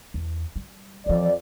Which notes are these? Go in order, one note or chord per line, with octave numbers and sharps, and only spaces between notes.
E2
G3
F2 E3 F3 D5